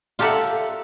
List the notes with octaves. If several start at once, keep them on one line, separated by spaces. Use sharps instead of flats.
F4 G4 A4 A#4 E5 F#5